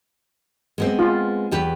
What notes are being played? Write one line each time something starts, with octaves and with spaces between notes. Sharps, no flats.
G#3 B3 C4
F4
E2 G4 B4